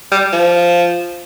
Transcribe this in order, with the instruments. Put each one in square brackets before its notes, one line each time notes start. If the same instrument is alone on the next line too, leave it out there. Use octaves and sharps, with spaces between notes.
[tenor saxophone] G3
F3